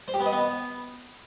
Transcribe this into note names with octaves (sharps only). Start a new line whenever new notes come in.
C5
G4
B3
D#5
B3